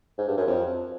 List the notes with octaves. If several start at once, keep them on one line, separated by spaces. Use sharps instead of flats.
G#2
G2
F#2
F2